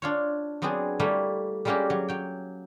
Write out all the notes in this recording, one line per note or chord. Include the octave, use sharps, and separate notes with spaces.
D4 F4 C#5
F#3 B3 C4 D4 G#4
G3 A3 A#3 E4 C#5
G3 G#3 A#3 C#4 F#4 G4
F#3
F#3 G5